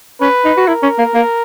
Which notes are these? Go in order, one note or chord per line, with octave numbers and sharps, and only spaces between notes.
C#4 B4
D#4
F#4
E4 A#4
C#4
A#3
A#3